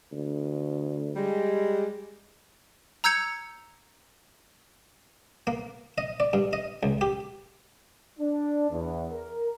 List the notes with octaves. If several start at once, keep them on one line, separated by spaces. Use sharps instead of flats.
D2
G3 G#3
A#5 E6 G6 G#6 C#7 F7
A#3
D#5
D5
G2
D#5
C#2
G4
D4
E2
A#4